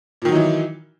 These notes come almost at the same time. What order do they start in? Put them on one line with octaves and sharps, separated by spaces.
A#2 D#3 F#3 D#4 E3